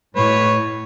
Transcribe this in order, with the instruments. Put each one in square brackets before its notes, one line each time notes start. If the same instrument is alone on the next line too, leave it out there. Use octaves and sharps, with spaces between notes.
[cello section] A2 [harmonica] B4 C#5